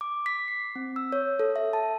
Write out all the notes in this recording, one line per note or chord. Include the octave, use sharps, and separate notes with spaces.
D6
B6
C7
C4
E6
C#5
A4
E5
A5